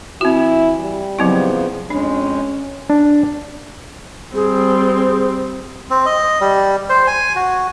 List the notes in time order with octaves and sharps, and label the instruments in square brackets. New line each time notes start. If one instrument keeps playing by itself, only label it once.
[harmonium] E3 [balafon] C4 F#4 [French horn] E4
[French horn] G3
[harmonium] C#3 F3 B3 [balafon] F#3 C4 E4
[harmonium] F2 G#3 [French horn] C#4 [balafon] D4
[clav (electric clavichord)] D4
[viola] G3 C4 [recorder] G#4
[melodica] C4
D#5
G3
C5
G#5
F#4